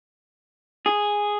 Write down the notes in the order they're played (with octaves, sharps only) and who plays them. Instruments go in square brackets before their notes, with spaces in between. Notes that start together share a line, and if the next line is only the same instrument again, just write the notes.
[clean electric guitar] G#4